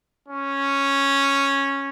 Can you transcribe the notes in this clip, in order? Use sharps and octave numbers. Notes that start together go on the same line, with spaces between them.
C#4